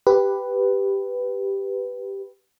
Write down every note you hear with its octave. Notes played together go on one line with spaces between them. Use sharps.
G4 B4